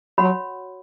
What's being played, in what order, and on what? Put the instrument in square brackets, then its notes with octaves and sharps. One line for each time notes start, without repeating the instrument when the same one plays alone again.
[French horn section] F#3 [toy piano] F#4 C#5 F#5 B5